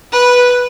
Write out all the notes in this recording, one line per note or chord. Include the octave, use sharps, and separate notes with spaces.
B4